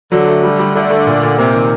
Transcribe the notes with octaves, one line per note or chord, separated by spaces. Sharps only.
D3 F#3
A3
G3
G3
D3 A3
A3
A#2
A#2
C3 A#3
D#3